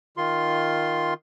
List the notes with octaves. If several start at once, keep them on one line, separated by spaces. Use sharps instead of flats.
D#3 F4 C6